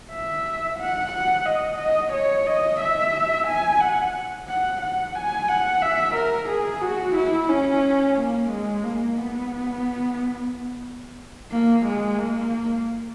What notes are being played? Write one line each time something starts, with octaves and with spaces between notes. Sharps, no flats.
E5
F#5
F#5
D#5
D#5
C#5
D#5
E5
G#5
F#5
F#5
F#5
G#5
F#5
E5
A#4
G#4
F#4
E4
C#4
A#3
G#3
A#3
B3
A#3
G#3
A#3